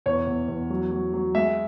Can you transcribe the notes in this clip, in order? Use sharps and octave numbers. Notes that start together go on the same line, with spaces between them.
E2 C#5
E2
E2
F#3
F#3
F#3
G#3 E5